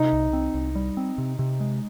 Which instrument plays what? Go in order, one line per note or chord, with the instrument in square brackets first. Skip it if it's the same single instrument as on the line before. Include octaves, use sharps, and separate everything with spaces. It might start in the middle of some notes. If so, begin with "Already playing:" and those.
Already playing: [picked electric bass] C3 [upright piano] D#4
[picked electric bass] C2
C4
C2
G3
C4
C3
C3
G#3